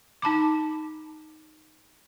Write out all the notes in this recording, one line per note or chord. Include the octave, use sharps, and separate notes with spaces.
D#4 A5 B5 D6